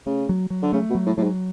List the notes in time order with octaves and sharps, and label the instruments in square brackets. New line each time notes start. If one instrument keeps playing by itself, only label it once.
[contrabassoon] C#3 [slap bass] A3
[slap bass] F#3
F#3
[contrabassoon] D3
[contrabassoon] C#3 [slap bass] A3
[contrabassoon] B2
[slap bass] F#3
[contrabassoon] A2
[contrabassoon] A2 [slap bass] F#3
[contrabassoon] G#2